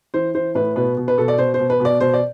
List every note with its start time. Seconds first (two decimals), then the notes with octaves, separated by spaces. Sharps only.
0.14 E3 C5
0.35 E3 C5
0.55 A2 B4
0.76 B2 B4
0.97 B2
1.08 B4
1.18 B2 A4
1.28 D5
1.38 B2 C5
1.54 C5
1.59 B2
1.70 B4
1.80 B2
1.85 D5
2.00 B2 C5
2.14 D5